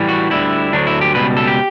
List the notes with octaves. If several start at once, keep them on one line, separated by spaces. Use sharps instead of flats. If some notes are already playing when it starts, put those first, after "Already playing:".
Already playing: A2 E3 G3
F#4
D2 D3 G3 E4
D2 D3 F#3 D4
E4
G4
C#2 B2 G3 B4
A4
G4